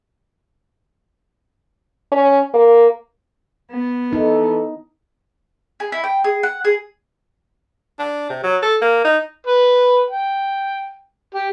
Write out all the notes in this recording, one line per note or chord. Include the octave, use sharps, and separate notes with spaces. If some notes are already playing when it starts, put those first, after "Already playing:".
C#4
A#3
B3
E3 D#4 A4
G#4
E4
G5
G#4
F#5
G#4
D4
C3
F#3
A4
A#3
D#4
B4
G5
G4